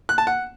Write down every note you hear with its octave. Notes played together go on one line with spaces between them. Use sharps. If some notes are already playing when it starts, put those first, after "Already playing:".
F#6
A5
F#5